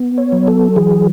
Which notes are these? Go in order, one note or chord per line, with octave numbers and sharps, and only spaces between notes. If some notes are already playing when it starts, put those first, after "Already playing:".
Already playing: B3
C#5
F#3
A4
E3 G#4